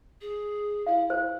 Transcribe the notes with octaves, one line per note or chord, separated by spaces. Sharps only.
G#4
E4 F5
C5